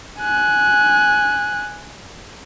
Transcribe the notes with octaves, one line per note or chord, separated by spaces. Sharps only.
G#5 F#6